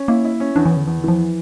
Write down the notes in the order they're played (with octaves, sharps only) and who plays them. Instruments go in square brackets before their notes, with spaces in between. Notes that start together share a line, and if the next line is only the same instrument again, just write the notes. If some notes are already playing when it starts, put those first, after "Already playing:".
Already playing: [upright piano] C#4
[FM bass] A#3 [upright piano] E4
[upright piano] E4
C#4
[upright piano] E2 [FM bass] D4
[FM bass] E3
[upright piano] E2
[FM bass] D3
[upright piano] E2 [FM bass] E3
[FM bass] D3
[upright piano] E3 [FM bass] F3